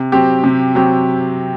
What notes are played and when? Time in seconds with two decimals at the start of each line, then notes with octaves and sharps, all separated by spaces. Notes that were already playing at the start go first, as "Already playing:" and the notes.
Already playing: C3
0.12 F#3 C4 G4
0.44 C3
0.75 F#3 C4 G4